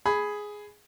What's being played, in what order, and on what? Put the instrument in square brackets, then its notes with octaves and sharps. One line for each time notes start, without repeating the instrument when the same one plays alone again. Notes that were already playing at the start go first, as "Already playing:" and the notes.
[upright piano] G#4 B5